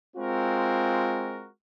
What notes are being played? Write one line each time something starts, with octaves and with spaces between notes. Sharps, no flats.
G#3 C4 F4 F#4 A#4